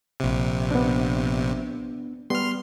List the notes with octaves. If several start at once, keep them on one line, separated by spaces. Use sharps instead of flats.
A#1 C3
B3 D4
G3 B3 C6 F6